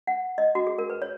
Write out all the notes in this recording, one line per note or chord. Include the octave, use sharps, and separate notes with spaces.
F#5
D#5
F#4
G#4
A#4
B4
C#5